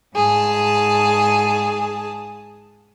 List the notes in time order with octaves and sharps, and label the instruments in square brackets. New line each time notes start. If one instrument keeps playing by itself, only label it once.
[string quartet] G#2 G#4 A5